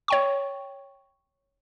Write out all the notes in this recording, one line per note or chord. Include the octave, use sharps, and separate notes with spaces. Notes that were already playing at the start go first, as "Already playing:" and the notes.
C#5 G5 C#6